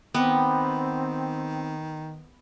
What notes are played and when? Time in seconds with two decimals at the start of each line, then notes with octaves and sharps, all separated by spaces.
0.14 D#3 B3 C4 G4 D#5 F#5